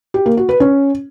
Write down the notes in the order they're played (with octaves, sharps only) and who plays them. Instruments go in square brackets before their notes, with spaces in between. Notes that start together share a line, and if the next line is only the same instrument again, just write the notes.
[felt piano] G4
A#3
F#4
B4
C#4